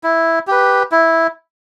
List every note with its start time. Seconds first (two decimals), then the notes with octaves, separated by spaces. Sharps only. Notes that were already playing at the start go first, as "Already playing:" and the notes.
0.04 E4
0.47 G4 B4
0.92 E4